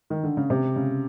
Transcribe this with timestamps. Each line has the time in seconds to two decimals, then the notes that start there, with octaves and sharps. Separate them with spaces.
0.10 D#3
0.24 D3
0.37 C#3
0.50 C3
0.76 C#3